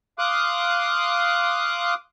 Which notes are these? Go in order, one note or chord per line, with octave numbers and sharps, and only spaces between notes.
F5 C6 D6 D#6 F#6